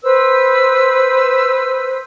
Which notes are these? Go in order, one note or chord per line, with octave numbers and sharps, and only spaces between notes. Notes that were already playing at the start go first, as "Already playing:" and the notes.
B4 C5 E6